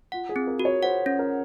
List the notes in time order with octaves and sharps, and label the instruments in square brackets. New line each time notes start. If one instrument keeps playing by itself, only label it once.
[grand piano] F4 [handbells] F#5
[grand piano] G#4
[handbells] C4
[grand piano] A#4
[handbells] F#4
[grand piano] C#5
[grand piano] C5 [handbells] F#5
[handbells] C#4
[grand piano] A#4